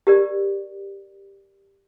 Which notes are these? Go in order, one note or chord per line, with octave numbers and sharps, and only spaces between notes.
G4 A#4 D5